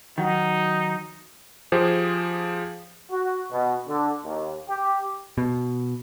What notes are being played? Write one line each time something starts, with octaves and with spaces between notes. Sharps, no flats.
D#3 F#3 D#4
F3 G4 G#4 C5
F#4
B2
D3
D#2
G4
B2